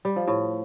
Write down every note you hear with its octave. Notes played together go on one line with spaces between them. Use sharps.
G3
F3
A2